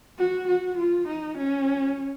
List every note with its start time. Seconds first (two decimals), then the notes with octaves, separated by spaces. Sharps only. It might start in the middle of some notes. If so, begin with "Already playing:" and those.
0.19 F#4
0.48 F#4
0.78 F4
1.08 D#4
1.37 C#4